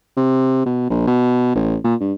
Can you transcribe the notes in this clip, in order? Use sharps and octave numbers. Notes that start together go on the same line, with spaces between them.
C3
B2
A#1
B2
A1
A#2
G2